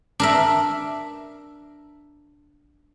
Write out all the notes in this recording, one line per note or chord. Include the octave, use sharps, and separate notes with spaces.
D4 A#4 E5